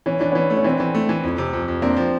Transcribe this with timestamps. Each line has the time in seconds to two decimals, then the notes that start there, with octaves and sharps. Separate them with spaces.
0.06 E3 C#4
0.20 E3 D4
0.32 E3 B3 C#4
0.50 A3
0.57 C#4
0.64 E3 C4 D4
0.80 E3
0.95 A3
1.09 E3
1.24 F2
1.38 C3
1.53 F2
1.68 F2
1.82 A#3 C4 D4
1.97 F3